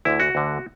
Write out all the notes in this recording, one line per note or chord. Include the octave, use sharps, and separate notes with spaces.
D2 D3 E4
F#4
D2 D3